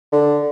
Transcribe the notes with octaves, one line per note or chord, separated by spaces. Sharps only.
D3